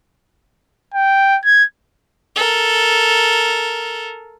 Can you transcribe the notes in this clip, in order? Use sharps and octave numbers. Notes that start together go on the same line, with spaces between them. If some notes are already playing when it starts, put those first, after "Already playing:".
G5
G#6
A4 A#4